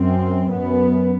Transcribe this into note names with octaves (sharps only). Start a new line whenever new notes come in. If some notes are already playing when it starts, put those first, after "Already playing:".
Already playing: F#2 C4
F#2 B3